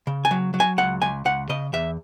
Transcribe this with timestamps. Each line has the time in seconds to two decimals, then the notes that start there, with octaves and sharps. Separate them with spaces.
0.07 C#3
0.25 G#5
0.31 F#3
0.54 F#3
0.60 G#5
0.78 C#2 F#5
1.02 C#2 G#5
1.25 C#2 F#5
1.49 C#3 D#5
1.73 E2 E5